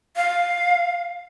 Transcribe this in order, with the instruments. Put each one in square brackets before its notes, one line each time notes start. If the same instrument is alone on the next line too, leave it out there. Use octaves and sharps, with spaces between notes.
[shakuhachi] F5